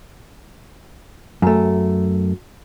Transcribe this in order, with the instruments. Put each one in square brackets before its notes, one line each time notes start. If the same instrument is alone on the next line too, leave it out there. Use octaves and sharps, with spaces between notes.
[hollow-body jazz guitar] F#2 A3